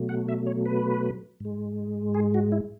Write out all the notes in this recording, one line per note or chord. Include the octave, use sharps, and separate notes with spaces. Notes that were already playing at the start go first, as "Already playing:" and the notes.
Already playing: B2 F#3 A3
F#5
E5
C#5
B4
G#2 G#3
G#4
F#4
E4